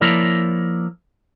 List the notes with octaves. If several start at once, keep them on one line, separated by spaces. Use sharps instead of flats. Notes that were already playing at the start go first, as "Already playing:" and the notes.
F3 A#3 E4 A#4 C#5 D5